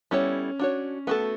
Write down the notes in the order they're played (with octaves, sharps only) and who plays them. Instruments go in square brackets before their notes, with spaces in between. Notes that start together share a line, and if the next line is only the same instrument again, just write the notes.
[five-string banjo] G3 B3 E4 A4 C#5 [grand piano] C#4
[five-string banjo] D4 F#4 C#5
[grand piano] A3 [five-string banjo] B3 F#4 A4